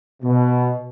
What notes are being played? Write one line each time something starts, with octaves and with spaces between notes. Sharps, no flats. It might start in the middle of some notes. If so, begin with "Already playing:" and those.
B2